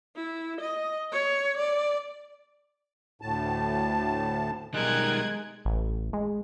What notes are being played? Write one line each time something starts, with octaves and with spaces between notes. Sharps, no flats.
E4
D#5
C#5
D5
D2 A2 A5
B1 D#3 G3 G#3 A#4 F#6 G#6
A1
G#3